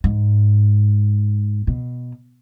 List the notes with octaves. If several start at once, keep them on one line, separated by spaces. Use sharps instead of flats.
G#2
B2